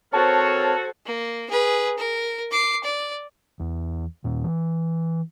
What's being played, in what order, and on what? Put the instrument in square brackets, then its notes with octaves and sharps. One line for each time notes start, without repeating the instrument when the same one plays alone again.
[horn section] C4 A#4 C#5 [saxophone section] F#4 [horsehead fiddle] A4 C5 [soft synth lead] A5
[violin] A#3
G#4 B4
A#4
D6 C7
D5
[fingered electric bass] E2
D#2 A#2
E3